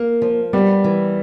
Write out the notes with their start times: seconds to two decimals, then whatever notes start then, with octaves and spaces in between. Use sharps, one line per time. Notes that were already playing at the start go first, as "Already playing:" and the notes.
Already playing: A#3
0.22 F3
0.53 G3 B3
0.84 E3